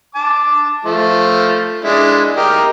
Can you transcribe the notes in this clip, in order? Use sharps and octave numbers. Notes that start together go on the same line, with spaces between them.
A5 D6
F3 A3
G#3 D4 E4
G4 A#4 D#5